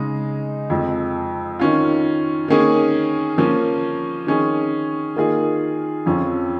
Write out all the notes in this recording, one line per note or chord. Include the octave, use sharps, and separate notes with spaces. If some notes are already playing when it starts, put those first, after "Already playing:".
Already playing: C#3 G#3 D#4 G#4
F2 F3 G#3
D#3 C#4 F4
D#3 A#3 C#4 G#4
F3 A#3 C#4
D#3 C#4 G#4
D#3 A#3 F4 G#4
F2 F3 C#4 F4